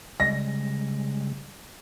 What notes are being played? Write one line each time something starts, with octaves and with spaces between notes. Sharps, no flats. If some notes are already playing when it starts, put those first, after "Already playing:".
C#3 G3 G#3 A#6